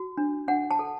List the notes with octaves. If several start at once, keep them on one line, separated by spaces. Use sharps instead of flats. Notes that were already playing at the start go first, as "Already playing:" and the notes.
Already playing: F#4
D4
D4 F#5
A5
A4